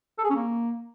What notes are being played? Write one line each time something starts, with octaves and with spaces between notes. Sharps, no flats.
A4
G#4
C#4
A#3